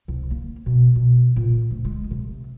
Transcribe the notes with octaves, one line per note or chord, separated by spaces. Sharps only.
C2
A#3
B2
B2
A#2
D2
G#3
C3